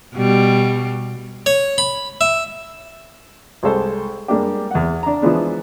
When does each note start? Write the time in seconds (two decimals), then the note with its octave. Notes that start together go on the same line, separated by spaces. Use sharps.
0.14 B2 G3
1.46 C#5
1.78 B5
2.21 E5
3.63 C2 G#3 A4 C5
4.28 G3 G#3 A#3 D4 G4
4.71 E2 F#5
5.03 D4 A#5
5.22 E3 F3 G#3 B3 D4